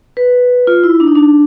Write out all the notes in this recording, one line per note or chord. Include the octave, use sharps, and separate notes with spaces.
B4
F4
E4
D4
D#4
D4